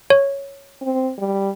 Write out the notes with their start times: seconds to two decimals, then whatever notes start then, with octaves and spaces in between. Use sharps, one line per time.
0.10 C#5
0.82 C4
1.18 G3